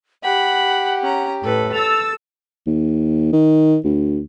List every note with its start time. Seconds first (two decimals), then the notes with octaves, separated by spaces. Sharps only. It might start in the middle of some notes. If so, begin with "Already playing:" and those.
0.23 G4 F#5 B5
1.02 C#4 A#5
1.43 A2 A4 B4
1.73 A4 E6 A6 F7
2.67 D#2
3.33 D#3
3.84 D2